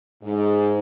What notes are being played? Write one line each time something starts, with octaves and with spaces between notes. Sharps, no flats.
G#2